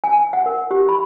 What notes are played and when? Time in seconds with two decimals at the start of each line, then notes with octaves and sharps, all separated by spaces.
0.04 G#5
0.33 F#5
0.46 A#4
0.71 G4
0.89 B5